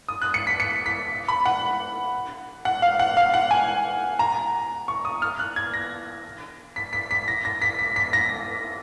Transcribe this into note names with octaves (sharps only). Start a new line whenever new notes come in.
D#6
F#6
C#7
B6
C#7
B6
B5
F#5
F#5
F5
F#5
F5
F#5
G#5
A#5
C#6
D#6
F6
F#6
G#6
A#6
B6
B6
B6
A#6
A#6
B6
B6
B6
A#6